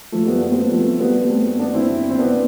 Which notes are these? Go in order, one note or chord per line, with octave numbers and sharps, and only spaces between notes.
F3 A3
G3 B3
G3 B3
C4
B3
F3 A3
G3 B3
A3 C4
B3 D4
C4 E4
C4
B3 D4